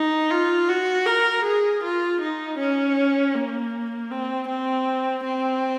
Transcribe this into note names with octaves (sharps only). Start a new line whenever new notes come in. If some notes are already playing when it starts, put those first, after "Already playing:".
Already playing: D#4
F4
F#4
A#4
G#4
F4
D#4
C#4
A#3
C4
C4
C4